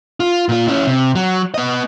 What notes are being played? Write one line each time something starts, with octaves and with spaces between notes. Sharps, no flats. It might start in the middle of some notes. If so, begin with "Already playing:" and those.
F4
A#2 F4
C#4 E4
C3
F#3
B3 D#5